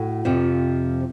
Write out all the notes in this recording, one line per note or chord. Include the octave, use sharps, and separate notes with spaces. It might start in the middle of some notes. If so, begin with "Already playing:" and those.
Already playing: A2 F#4
F2 C3 F3